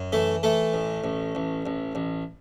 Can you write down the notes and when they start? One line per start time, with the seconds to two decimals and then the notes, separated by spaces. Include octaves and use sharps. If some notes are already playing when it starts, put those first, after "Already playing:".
Already playing: F#2
0.12 E3 A3 A4
0.43 E3 A3 A4
0.74 A1
1.04 A1
1.35 A1
1.66 A1
1.95 A1